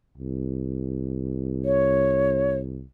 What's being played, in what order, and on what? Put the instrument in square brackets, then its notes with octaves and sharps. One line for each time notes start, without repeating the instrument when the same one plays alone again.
[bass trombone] C2
[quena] C#5